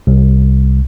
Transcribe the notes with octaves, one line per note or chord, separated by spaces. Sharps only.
C2